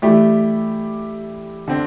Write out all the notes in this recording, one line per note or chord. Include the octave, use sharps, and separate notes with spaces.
E3 G3 A3 E4 G4 D5
D3 C4